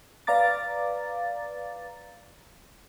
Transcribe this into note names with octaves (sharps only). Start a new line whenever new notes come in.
B4 D5 F5 A#5 D6 A6